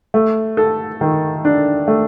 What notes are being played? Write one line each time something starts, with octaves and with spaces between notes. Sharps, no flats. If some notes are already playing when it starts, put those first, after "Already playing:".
A3
A4
D#3
D4
A3